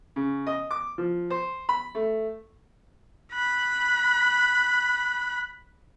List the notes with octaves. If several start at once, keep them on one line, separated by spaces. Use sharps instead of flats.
C#3
D#5
D6
F3
C5
B5
A3
B5 F#6